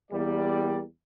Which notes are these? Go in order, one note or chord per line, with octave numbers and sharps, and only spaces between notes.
E2 G3 A#3 D5